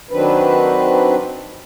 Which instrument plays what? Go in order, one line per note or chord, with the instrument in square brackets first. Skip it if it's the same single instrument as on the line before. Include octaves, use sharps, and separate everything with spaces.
[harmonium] D#3 F#3 C4 D4 B4